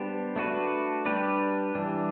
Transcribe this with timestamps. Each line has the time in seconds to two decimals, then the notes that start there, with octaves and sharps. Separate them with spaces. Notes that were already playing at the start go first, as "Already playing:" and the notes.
Already playing: G3 B3 D4 G4 C5
0.36 A3 D4 F#4 B4
1.05 G3 D4 G4 B4 D5
1.75 E3 G3 D4